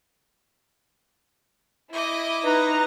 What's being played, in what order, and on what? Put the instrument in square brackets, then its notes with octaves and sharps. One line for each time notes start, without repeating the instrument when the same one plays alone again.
[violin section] E4 [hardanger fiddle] D#5 D6
[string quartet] D#4 A#5 [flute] B4